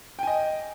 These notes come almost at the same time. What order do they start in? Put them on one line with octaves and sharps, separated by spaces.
G5 G#5 D#5